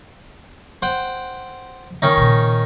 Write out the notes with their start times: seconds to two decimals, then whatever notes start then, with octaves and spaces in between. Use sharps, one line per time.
0.82 C5 F#5 G5
2.02 D#3 C#4 D#4
2.17 A#2 C#3